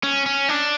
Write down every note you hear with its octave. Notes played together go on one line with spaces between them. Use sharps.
C#4
C#4
D4